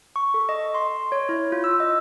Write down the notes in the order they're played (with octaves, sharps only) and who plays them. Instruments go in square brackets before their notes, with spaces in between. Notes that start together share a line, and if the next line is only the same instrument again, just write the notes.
[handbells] C#6
A4
D#5
C6
C#5
E4
F4
E6
D#5